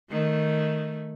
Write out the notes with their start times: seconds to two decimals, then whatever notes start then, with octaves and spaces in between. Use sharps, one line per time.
0.10 D#3 A3